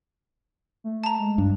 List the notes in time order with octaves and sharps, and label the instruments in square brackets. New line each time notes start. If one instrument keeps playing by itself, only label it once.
[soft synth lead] A3
[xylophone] A5 A#5
[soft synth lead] G#3
[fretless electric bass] G2 [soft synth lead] D4